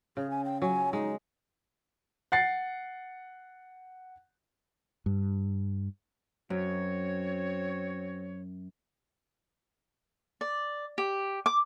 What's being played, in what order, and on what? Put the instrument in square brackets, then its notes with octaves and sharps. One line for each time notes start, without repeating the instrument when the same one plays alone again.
[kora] C#3 [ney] G#4
[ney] G#5
G5
[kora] F#3 [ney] G#5
[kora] G#3 [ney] D#4
[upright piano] F#5 A6 C7
[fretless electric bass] G2
[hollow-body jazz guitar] F#2 [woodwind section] C4 F#4 C#5
[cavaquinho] D5
G4
D6